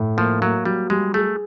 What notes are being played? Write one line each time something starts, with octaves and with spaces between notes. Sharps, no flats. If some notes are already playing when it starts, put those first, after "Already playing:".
Already playing: A2
F3 A#3
F#3 A#3
F#3 G3
G3 G#3
A3 G#4